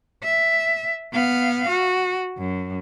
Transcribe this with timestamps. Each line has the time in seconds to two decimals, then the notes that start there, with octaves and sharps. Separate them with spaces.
0.23 E5
1.12 B3 F5
1.69 F#4
2.38 F#2